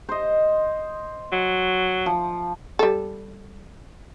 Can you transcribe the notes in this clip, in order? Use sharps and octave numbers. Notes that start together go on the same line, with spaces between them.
C5 D#5
F#3
F3
G3 A4